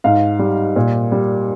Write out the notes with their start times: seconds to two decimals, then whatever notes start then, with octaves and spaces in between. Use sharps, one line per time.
0.04 G#2 F5
0.39 G3
0.76 A#2
1.12 G3